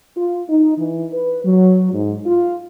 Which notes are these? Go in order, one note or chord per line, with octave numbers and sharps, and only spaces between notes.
F4
D#4
E3
B4
F#3
G#2
F4